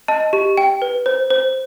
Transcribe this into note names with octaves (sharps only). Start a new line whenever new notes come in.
D#5 A5
G4
G5
B4
C5
C5